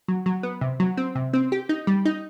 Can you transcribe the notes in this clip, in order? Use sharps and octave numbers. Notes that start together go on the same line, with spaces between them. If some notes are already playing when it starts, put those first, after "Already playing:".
F#3
F#3
B3
C3
F#3
C4
C3
C4
G4
D#4
G3
D#4